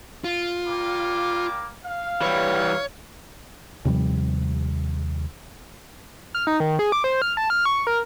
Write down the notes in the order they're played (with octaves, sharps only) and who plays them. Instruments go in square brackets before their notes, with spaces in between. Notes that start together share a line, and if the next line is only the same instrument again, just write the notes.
[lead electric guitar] F4
[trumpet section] G3 A#3 D6
F5
[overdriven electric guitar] E3 G3 [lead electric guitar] C#5
[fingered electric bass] D#2 C3 F3 G3
[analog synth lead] F6
D#4
D#3
G#4
D6
C5
F6
A5
F6
C#6
A#4